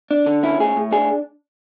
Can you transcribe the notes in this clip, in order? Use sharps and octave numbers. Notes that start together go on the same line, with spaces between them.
D4
D3
C#4 E4
A2 G#4
A2
D4 G#4